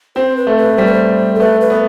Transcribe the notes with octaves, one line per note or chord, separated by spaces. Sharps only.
C4 C5
B4
A3
B4
G3 C5
B4
C5
A4
A3 B4
B4
B3